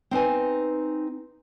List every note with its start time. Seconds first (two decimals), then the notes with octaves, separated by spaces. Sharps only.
0.11 C4 D#4 B4 G#5